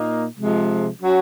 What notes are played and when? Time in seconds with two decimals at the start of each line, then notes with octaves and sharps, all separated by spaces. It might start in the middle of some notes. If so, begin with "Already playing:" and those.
Already playing: A#2 A#3 D#4
0.38 C3 F3 G#3
1.01 F#3 C#4 F#4